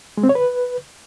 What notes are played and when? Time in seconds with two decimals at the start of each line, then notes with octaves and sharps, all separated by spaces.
0.17 G#3
0.23 C4
0.29 C#5
0.35 B4